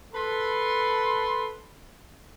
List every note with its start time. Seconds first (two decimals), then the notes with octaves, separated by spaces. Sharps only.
0.14 A4 B4 C6